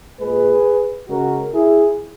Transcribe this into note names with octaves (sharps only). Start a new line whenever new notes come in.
A#2 G#3 G#4 B4
C#3 G#3 F#4 A#4
E4 G#4